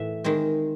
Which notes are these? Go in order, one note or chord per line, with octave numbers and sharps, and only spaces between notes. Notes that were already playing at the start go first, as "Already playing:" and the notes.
Already playing: A2 E3 A3 E5
D#3 G#3 C4